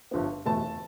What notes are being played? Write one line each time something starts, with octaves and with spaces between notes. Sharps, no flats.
G1 G2 F3 B3
F1 E2 B2 A3 A5